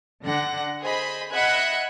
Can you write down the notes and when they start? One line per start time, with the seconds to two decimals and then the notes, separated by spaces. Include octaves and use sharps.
0.25 D3 F#5 A#6
0.81 G#4 C5 D#5 B5
1.33 D#5 E5 F#5 B5 F#6 G#6